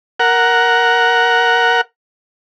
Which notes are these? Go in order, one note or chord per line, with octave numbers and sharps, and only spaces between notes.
A#4 F#5